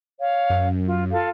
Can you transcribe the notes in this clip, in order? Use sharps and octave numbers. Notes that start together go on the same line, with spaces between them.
C#5 F5
F#2
F4
F4 A4 F5